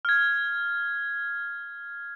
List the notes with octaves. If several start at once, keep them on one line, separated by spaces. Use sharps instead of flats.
F6 G#6